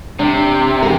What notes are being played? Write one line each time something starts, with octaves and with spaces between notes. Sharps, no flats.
C3 D4
E2 A#4